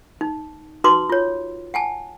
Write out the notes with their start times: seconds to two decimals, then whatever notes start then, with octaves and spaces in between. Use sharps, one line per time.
0.21 D#4
0.84 D#4 F#4 B4 C6 D6
1.10 F4 C#5
1.74 F#5 G#5 A5